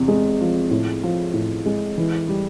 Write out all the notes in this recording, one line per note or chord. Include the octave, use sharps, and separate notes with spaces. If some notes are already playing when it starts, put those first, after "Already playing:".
Already playing: E2 C3
G#3
F3
A2
F3
A2
G#3
E3
G3